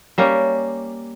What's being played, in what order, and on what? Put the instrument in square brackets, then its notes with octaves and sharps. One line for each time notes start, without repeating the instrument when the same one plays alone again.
[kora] G3 A#3 C#4 G4